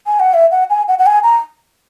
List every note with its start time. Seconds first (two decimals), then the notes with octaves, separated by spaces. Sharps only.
0.07 G#5
0.20 F#5
0.34 E5
0.51 F#5
0.70 G#5
0.88 F#5
0.99 F#5
1.06 G#5
1.23 A#5